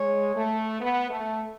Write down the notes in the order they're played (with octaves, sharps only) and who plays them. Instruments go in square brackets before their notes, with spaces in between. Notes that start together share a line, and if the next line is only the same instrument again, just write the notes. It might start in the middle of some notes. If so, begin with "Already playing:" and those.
Already playing: [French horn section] G#3 [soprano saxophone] C#5
[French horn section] A3
B3
A3